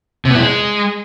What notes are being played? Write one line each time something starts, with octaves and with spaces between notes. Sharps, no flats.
C3
B3
E4
G#3